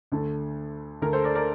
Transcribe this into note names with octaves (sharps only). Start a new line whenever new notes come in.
D2 D3 A3
D2 D3 A3 A#4
A4 C5
A#4 D5
A#4 D5